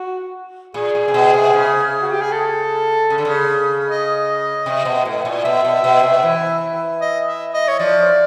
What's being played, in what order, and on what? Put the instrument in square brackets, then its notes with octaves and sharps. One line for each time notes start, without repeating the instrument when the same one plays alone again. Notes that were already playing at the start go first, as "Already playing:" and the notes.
Already playing: [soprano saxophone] F#4
[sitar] A#2 [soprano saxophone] G#4
[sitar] A#2
C3
B2
C3
C#3
[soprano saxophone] F#4
G4
G#4
A4
[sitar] C#3
D3
C#3
[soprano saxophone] D#5
[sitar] C3
B2
A2
A#2
[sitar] B2 [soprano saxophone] E5
[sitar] B2
B2
C3
E3
[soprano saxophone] D#5
E5
D#5
C#5
[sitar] F3 [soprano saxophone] D5